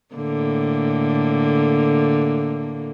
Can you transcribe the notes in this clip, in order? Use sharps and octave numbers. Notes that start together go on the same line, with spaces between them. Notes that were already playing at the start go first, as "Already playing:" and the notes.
A2 D3 A#3